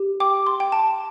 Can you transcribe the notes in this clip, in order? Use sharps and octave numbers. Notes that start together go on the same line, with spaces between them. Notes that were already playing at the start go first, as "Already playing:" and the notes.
Already playing: G4
G5 D6
C6
G5
A5